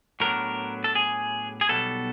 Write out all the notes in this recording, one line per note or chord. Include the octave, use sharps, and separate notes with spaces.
A2 F#3 B3 D4 A#4
A4
G#4
G#4
B1 B2 G3 B3 A4